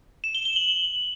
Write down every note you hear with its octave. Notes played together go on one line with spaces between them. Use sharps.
E7
G7
G7
F#7